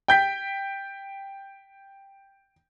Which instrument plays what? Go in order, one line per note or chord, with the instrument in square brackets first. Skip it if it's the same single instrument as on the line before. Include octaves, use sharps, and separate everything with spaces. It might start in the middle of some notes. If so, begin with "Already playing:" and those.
[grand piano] G5 G6 B6